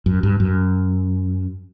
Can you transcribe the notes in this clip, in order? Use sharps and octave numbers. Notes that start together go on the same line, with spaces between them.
F#2
G2
F#2